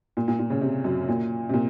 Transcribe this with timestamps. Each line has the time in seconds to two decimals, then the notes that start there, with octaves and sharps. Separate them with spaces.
0.17 A#2
0.28 A#2
0.39 A#2
0.50 C#3
0.62 C3
0.84 F#2
1.08 A#2
1.49 C3
1.54 A#2